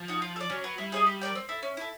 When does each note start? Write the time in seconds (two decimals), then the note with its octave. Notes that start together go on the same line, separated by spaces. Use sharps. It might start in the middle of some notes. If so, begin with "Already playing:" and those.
Already playing: F3
0.08 D#4 F#4
0.22 F4
0.36 A4
0.40 D5
0.50 F#3 C#4
0.64 F#4 B4
0.78 G3 E4
0.92 G#4 C5 D#5
1.06 G4
1.21 A#4 D5 G5
1.35 C4
1.49 E4 A4
1.63 C#4
1.77 E4 A4